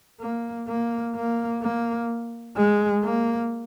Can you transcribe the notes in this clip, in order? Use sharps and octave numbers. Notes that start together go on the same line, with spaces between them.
A#3
A#3
A#3
A#3
G#3
A#3